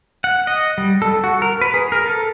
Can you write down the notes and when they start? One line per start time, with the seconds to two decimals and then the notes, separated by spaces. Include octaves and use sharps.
0.24 F#5
0.47 D#5
0.78 G3
1.02 A4
1.24 F#4
1.42 A#4
1.61 B4
1.74 G#4
1.92 A#4
2.06 A4